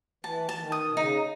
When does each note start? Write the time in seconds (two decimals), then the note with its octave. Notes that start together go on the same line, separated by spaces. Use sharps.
0.24 E3 A5
0.49 E3 A5
0.60 D#3
0.72 D#6
0.89 B2
0.97 C#3 D#4